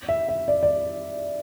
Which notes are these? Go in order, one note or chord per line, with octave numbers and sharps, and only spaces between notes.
E5
E5
D5
D5